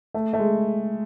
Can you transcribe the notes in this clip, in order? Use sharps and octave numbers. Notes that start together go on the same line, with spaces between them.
A3
A3
G#3